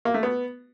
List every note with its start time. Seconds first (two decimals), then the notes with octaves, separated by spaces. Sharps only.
0.05 A#3
0.14 A3
0.23 B3